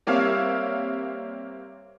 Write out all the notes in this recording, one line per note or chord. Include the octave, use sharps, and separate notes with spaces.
G3 A#3 C4 C#5 E5 F5